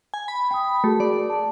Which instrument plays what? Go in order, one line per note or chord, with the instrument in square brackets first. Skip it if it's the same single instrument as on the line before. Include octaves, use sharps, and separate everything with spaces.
[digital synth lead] G#5
B5
[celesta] G5 D#6
[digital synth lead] A3 [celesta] F#4 G#4 A#4
[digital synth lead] D5
[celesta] A5